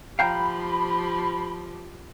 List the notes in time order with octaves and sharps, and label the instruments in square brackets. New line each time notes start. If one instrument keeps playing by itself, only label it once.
[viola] F3 G4 [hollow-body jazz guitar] F5 G5 A#5 [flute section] B5